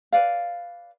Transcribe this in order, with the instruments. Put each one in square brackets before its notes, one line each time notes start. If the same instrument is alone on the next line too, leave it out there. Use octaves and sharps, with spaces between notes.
[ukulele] B4 D5 F5